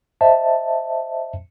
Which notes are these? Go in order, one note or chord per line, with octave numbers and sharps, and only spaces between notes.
C5 D#5 E5 A5